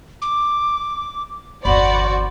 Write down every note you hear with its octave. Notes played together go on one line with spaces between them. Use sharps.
D6
G1 E2 F#4 C5 D5 B5